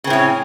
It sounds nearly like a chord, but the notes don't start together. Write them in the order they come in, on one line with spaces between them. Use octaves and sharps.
C#3 C4 A2 C#4